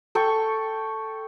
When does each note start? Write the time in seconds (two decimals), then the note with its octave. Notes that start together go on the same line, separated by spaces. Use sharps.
0.15 A4 G5 C#6